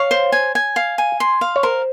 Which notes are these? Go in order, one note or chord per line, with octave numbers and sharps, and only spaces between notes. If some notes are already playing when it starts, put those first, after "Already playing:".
Already playing: C#5 F5
C5
G#5
G#5
F5
G#5
C6
F5
C#5
A#4 C5